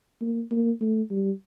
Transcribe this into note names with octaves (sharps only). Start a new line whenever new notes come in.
A#3
A#3
A3
G3